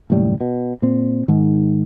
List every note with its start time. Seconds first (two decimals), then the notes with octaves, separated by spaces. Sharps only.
0.10 F#1 D#2 A2 G3
0.41 B2
0.82 A#2 C4
1.28 G#2 D#3